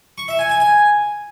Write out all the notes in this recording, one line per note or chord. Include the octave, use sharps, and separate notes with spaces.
C#6
E5
G#5
G#5
G#5